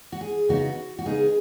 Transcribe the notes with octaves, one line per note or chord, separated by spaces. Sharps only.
F#4
G#4
C#3 B3 D#4 F#4
F#4
C#3 B3 D#4 G#4